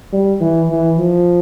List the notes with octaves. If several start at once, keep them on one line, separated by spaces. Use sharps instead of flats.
G3
E3
E3
F3